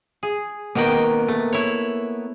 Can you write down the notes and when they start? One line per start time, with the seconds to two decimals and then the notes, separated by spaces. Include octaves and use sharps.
0.23 G#4
0.75 B2 D#3 A#3 B3 A#4 G5
1.28 A3
1.53 E4 C#5